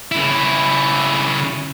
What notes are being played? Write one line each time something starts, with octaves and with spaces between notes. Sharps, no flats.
C#3 E4